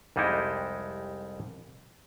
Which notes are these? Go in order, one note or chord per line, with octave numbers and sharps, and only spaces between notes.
C2 F2 G3 G#3 D#4 E4